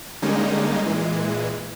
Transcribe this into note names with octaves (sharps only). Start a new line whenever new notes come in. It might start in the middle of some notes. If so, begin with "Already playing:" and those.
D3 G3 G#3 A#3 C#4 D#4
A#2 E3 G#3